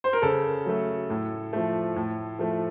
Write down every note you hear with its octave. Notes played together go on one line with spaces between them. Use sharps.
C5
A#4
C#3 A4
F#3 A3
A2
F3 A3
A2
F3 A3